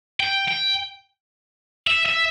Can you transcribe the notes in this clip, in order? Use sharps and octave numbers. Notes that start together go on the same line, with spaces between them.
G5
G5
E5
E5